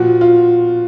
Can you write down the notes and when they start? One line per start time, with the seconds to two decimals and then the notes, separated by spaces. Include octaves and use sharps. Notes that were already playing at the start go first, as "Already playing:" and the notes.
Already playing: A#2 F3 F#4
0.21 F4